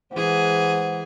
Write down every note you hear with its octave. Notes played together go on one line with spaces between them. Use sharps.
E3 G#3 G#4 C5 F#5